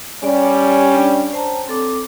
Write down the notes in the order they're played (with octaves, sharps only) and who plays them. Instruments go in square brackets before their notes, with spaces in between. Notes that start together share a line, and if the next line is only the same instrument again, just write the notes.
[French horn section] G3 C#4 [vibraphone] D5
[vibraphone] D4 D5 G5
C5 A5 A#5
C4 A4 D6